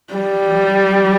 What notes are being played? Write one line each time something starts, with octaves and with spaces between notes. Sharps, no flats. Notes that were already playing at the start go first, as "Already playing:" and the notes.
G3